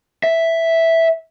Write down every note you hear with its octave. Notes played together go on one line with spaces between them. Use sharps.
E5